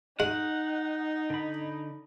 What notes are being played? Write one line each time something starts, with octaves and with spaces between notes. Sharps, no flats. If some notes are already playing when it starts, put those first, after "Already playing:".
G#3 D#4 F#5
D3 B5